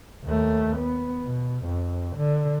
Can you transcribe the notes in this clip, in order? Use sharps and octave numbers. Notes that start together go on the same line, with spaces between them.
D#2 A3
B3
B2
F2
D3